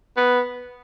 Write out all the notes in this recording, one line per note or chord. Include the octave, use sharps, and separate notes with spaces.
B3